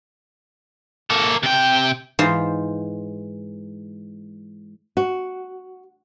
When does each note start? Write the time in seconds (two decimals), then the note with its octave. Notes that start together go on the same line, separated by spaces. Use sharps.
1.10 A#3 A4
1.43 C3 G5
2.19 G#2 E3 F4 C5
4.97 F#4